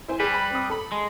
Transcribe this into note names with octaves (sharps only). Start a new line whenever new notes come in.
E4 C5 G#5
G3 G#4 B4
B5
C4 D#6
A4 B5
G#3